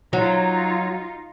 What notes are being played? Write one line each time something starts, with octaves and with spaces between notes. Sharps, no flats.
F#3 D#4 F4